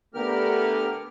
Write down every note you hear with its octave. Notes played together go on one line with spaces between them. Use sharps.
D3 A3 B3 G4 A#4 F6